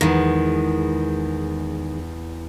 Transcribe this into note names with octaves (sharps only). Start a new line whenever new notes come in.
E2 D#3 G#3